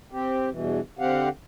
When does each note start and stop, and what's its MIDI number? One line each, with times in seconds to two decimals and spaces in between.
0.12 0.49 60
0.12 0.49 67
0.50 0.80 40
0.50 0.80 43
0.50 0.80 47
0.50 0.80 52
0.99 1.29 50
0.99 1.29 60
0.99 1.29 67
0.99 1.29 77
0.99 1.29 78